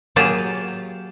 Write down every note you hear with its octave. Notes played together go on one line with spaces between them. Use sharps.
F#3 A#3 G4 G#4 A5